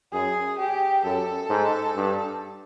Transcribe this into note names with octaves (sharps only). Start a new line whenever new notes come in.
F#2 G#4
G4
F#2 A4
G#2
G2